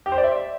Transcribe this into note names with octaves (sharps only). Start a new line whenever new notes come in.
G4
C5
D5
E5